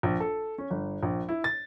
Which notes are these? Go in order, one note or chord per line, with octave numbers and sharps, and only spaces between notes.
A#1
A4
C#4
G1
A#1
E4
A6